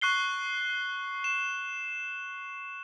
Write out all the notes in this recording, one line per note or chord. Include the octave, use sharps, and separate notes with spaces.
C#6 F#6 C7 G7
E7